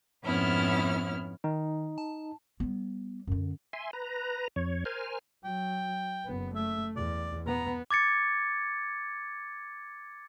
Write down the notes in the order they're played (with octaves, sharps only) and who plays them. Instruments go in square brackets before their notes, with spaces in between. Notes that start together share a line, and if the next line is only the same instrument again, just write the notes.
[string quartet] F2 G#2 B3 C#4 E4 F6
[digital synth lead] D#3 [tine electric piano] D#4
[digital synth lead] A5
[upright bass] G3 B3
F#2 D3
[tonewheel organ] E5 G#5 C6
B4 A#5
F2 C#5
A#4 C5 G#5 F6
[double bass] F#3 [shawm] G5
[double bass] F#1 B3
[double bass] A3 [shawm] E5
[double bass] E2 [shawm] D5
[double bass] B3 [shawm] A#5
[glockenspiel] D6 G#6 A6 C#7